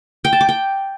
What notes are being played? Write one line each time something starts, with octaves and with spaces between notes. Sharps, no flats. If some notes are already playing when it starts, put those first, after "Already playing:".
G5
A5
D6
G5